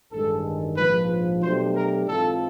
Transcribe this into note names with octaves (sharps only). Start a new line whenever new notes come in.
A1 G2 D#3 G#3 A4
A#1 G#2 F3 B4
B2 F#3 A3 D4 G4 C5
A#4
G#2 E3 G#3 C4 F4 A4